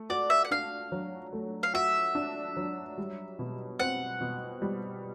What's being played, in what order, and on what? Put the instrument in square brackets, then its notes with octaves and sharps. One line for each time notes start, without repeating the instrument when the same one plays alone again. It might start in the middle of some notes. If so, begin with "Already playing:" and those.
Already playing: [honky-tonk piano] A3
[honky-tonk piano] F#4 [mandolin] D5
[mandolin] E5
F#5
[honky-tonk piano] D4 [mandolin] F5
[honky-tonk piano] F#3
A3
[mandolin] F5
[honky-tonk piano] F#4 [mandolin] E5
[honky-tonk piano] D4
F#3
G3
B2
[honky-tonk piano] C4 [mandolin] F#5
[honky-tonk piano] B2
G3